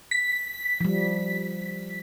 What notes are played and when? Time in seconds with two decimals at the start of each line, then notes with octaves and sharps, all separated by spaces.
0.11 B6
0.81 F3 G3